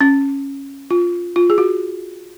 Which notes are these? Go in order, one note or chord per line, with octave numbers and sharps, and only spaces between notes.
C#4
F4
F4
G#4
F#4